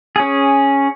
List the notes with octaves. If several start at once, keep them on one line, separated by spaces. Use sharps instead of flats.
C#4 G#4